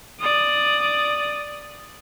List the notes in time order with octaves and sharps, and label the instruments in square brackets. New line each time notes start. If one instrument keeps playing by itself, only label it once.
[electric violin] D5 D#6